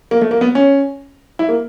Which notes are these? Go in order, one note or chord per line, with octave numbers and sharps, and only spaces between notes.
A#3
A3
A#3
B3
C#4
E4
A#3